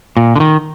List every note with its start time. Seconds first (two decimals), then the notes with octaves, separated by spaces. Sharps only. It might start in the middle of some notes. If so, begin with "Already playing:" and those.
0.17 A#2
0.36 D3
0.40 D#3